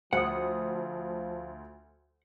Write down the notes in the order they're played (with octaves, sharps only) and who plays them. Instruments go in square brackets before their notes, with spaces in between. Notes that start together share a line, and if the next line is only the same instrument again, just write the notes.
[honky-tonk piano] D2 D#6 [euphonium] F3 [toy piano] C5 [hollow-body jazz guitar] F#5